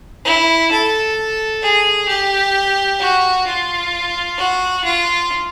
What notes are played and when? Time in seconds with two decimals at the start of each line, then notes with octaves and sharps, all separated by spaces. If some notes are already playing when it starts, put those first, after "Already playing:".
0.25 E4
0.72 A4
1.62 G#4
2.09 G4
3.00 F#4
3.47 F4
4.38 F#4
4.84 F4